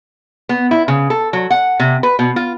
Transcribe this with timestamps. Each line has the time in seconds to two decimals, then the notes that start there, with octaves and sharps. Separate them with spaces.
0.49 B3
0.71 E4
0.88 C#3
1.10 A4
1.33 F#3
1.50 F#5
1.80 C3
2.03 B4
2.19 B2
2.36 F4